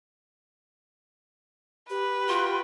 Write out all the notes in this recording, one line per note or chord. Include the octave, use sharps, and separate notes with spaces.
G4 B4
F4 F#4 G5 C6